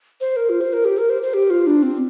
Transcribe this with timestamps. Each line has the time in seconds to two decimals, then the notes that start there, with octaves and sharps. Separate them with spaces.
0.21 C5
0.36 A#4
0.49 F4
0.61 C5
0.73 A#4
0.85 G4
0.98 A#4
1.10 C5
1.22 C5
1.34 G4
1.50 F4
1.67 D4
1.83 C4